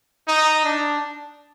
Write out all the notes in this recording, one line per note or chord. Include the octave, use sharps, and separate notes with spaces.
D#4
D4